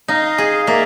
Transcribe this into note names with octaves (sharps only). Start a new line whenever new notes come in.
D#4 D#5 F5
G#4
A#3 D5 E5